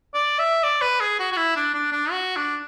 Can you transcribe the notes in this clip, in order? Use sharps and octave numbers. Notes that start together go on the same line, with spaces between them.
D5
E5
D5
B4
G#4
F#4
F#4
E4
D4
D4
D4
F#4
D4